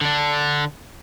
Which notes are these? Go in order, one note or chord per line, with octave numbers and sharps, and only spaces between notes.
D3 D4